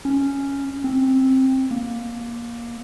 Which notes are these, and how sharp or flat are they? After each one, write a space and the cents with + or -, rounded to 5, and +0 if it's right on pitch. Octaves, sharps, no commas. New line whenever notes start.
C#4 +0
C4 +10
A#3 +15